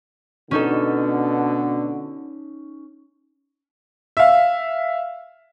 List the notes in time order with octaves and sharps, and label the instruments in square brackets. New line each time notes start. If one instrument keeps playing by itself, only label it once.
[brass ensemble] B2 D3 [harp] C#4 D#4 A4
[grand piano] E5 F5